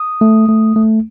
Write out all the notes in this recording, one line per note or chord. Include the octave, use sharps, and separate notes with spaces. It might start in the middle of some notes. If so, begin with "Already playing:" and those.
Already playing: D#6
A3
A3
A3